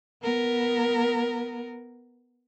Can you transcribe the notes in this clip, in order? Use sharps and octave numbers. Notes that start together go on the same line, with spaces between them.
B3 A#4